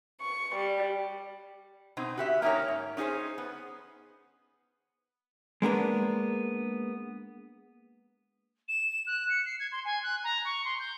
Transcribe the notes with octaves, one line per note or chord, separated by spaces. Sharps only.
C#6
G3
B2 C4 D#4
F#4 G4 E5
A#3 C#4 D#4 A#4 C#5
G#2
C#4 D#4 F#4 G#4 C5
B3
G#3 A#3 B3 D4
E7
F#6
C#7
C7
G#6
C6
G#5
F#6
A#5
C#6
C6
G6